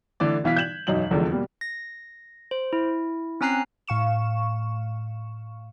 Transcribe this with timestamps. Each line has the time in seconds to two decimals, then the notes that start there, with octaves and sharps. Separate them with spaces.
0.20 D3 E3 A3 D5
0.44 B2 E3 F5 B6
0.56 G6 G#6 E7 F#7
0.87 E1 F#2 D#4 F#7
1.11 F1 E2 D3 F3 G#3
1.31 B2 G3 A#3
1.61 A#6
2.51 C5
2.73 E4
3.41 C4 C#4 G#5 A#5 F#6 C7
3.87 A2 F5 C#6 E7